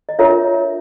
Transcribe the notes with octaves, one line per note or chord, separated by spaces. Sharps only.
D#5
D4 F4 A#4 C#5 E5